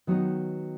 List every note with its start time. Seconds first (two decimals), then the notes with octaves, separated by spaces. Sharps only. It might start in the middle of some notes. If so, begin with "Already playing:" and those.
0.07 D#3 F#3 B3 D#4